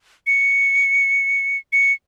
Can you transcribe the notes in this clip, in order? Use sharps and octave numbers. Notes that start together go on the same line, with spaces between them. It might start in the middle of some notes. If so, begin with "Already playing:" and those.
C#7
C#7